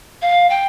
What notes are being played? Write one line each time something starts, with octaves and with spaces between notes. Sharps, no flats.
F5
G5